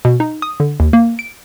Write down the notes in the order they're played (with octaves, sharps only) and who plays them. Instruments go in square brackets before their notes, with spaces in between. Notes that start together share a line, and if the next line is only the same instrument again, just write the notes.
[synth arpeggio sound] B2
D#4
D#6
D3
D#2
A#3
D7